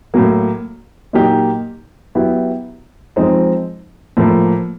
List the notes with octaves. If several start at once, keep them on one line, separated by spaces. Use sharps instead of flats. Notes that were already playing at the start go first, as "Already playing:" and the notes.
A2 F#3 A#3
A#2 F#3 A#3 D#4 G4
F#3 B3 E4 G4
F3 G#3 C4 D#4
A2 F3 A#3